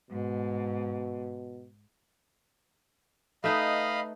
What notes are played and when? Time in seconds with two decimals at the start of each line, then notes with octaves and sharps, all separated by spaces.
0.10 G#2 B2
3.44 A3 D#4 B4 D#5 F5 B5